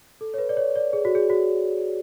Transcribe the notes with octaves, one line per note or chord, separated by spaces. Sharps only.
A4
C#5
B4
D5
C#5
D5
G#4
F#4
G#4
F#4